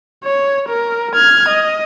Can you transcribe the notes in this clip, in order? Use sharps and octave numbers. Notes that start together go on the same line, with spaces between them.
C#5
A#4
F6 G#6
D#5